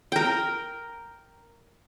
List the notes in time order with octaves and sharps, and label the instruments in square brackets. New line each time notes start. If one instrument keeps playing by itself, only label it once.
[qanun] A#4 G5